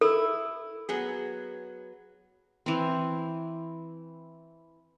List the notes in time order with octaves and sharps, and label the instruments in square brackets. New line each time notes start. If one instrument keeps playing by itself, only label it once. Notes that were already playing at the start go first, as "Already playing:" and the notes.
[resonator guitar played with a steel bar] E4 [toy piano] A4
[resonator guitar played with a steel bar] F#3 B3 G#4
[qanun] E3 C4